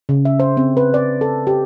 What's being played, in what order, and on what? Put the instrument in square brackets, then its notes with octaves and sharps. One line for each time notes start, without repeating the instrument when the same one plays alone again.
[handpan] C#3
E5
C5
C4
B4
D5
A4
G4